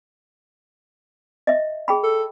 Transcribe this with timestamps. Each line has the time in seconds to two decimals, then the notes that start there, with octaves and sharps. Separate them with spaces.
1.47 D#5 E5
1.88 G#4 G5 B5
2.03 A4